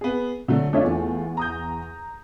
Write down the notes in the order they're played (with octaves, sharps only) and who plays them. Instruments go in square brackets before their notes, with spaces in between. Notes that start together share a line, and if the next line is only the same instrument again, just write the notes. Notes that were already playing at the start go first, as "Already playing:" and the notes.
[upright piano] B3 G#4
D3 F#3 A3
[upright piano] A3 F4 [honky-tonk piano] D4 C#5 E5
[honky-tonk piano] E2
[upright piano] A#5 D#6 G6